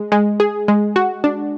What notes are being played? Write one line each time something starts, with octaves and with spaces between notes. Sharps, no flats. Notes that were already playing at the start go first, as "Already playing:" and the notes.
Already playing: G#3
G#3
G#4
G#3
F#4
D4